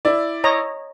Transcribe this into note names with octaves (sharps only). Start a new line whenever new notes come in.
E4 D5
C#5 D#5 A#5